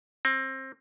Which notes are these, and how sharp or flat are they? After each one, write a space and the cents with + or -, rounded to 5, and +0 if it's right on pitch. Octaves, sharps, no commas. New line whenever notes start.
C4 +25